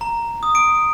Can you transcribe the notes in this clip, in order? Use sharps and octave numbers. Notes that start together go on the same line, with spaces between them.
A#5
D#6
D7